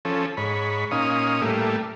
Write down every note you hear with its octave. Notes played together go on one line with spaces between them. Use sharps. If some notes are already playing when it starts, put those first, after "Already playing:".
F3 C#4 A4
G#2 C#5 B5
A#2 C#4 D#4 F5 D#6
A2 G3 A3 A#3